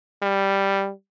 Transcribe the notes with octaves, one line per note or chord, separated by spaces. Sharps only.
G3